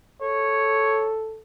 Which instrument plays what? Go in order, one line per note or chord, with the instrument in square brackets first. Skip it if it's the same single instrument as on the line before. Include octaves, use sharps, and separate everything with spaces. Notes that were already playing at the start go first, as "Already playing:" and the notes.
[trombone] A4 [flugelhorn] C#5